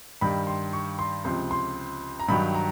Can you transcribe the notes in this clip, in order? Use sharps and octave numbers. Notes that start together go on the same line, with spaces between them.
G2 D#3 G3 B5
C6
C#6
C6
C#2 C3 F3 C6
C6
A#5
G2 D#3 F#3 B5
A#5